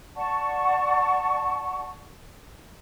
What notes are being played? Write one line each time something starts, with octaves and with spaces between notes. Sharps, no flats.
D5 F#5 A5 C#6